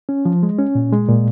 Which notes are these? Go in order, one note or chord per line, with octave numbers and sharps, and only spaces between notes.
C#4
F3
G#3
C#4
A#2
G#3
A#2